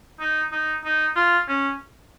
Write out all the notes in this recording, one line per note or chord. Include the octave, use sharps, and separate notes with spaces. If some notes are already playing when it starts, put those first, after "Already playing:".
D#4
D#4
D#4
F4
C#4